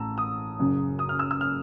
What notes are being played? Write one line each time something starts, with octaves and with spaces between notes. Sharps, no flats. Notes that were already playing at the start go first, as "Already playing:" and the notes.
Already playing: A1 A2 A5 A#5 E6
D#6
F#1 F#2 C#3
D#6
F6
E6
E6
F6